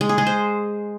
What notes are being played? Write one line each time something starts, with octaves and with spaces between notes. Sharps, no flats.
G#3
G#4
G#3
C5